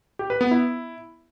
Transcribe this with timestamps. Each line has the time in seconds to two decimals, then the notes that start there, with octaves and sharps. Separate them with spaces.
0.19 G4
0.30 B4
0.41 B3
0.51 E4